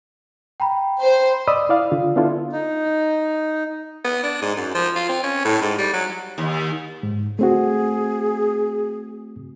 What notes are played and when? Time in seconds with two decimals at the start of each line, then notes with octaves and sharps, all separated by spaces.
0.60 G5 A#5 B5
1.02 C5
1.48 D5 D#5 B5 D#6 E6
1.69 E4 D5 F5
1.92 D3 F4
2.16 B3 D4 E4 F4 A4
2.53 D#4
4.04 B3
4.23 D4
4.41 G#2
4.56 F#2
4.74 F3
4.96 F4
5.09 C4
5.23 C#4
5.45 A2
5.61 G#2
5.78 G3
5.93 F#3
6.38 D#2
7.03 G#2
7.39 A3 C4 F#4 G#4